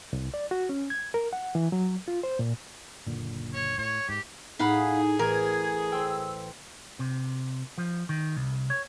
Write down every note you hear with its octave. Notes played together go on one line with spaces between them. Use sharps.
C2
D5
F#4
C#4
G#6
A#4
F#5
E3
F#3
F4
C5
A#2
F#1 A#2 D3
C#5
A2 C#5
G#2 G4
A2 D#4 G#4 F5 F#5 B5
A1 A#4 G#6
C5 G5 E6
C3
F3
D#3
C2
C#5